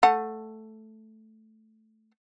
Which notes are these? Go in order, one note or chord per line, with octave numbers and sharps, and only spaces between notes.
A3 F#5